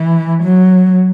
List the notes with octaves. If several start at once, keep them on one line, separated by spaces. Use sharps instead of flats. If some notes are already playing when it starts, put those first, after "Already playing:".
Already playing: E3
F#3